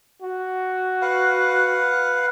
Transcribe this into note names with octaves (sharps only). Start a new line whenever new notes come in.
F#4
B4 F5 F#5